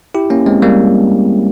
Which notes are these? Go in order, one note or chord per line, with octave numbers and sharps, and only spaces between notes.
E4 G4
A#3 C#4
G#3 C4
G3 A#3